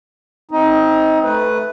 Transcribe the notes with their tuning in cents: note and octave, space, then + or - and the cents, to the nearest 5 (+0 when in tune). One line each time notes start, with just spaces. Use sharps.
C4 +5 D#4 +20
A3 +0 B4 +0